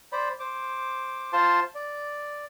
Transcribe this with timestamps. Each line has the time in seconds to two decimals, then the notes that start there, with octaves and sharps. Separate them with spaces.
0.12 C5 D5 B5
0.40 C5 D6
1.33 F4 C5 A5 C6
1.75 D5